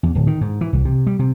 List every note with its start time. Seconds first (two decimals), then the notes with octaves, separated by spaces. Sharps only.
0.03 E2
0.15 D1
0.27 D#3
0.41 G#2
0.61 E3
0.73 C2
0.85 C3
1.07 G3
1.19 C3